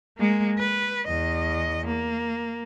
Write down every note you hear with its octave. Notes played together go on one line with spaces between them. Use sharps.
G#3 A#3
B4
E2 D#5
A#3